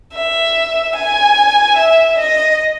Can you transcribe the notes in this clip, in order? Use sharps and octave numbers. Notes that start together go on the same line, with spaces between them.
E5
G#5
E5
D#5